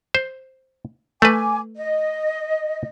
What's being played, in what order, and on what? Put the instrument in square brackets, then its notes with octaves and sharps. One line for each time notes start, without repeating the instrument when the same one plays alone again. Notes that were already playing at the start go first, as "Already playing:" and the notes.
[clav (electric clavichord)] C5
[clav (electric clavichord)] A3 B4 [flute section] G#5 D6
[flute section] D#5